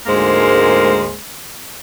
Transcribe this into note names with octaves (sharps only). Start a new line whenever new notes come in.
D2 G#2 G#3 A#3 A#4 C5